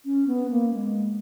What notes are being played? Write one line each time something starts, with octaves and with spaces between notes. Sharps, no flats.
C#4
B3
A#3
G#3